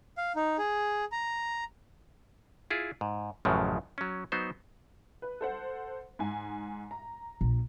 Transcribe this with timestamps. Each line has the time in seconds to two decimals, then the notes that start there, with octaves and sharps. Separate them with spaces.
0.17 F5
0.36 D#4
0.58 G#4
1.12 A#5
2.70 E4 F4 G#4
3.01 G#2
3.45 A1 F#2 A2 C#3 F3 F#3
3.98 F#3 C#4
4.32 F#3 B3 D#4 C5
5.22 B4
5.41 A4 C5 F#5
6.19 G#2 G#5
6.91 A#5
7.41 A#1